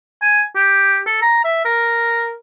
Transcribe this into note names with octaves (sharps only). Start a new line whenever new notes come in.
G#5
G4
A4
A#5
E5
A#4